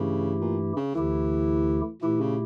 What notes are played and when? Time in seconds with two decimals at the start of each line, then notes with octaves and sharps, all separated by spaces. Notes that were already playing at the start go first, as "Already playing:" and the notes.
Already playing: G2 C#3 E3 A3 E4 G4
0.41 A#2
0.76 C#3
0.95 D2 D3 E3 A3 E4 G4
2.02 A#2 E3 A3 E4 G4
2.21 C#3